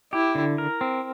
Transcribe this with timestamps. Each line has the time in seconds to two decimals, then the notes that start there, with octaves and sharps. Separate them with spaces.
0.13 E4 G4
0.35 D3
0.58 A#4
0.81 C4